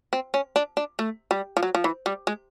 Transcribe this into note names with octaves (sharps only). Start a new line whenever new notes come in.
C4
C#4
D4
D4
A3
G3
F3
F#3
F3
E3
G3
G#3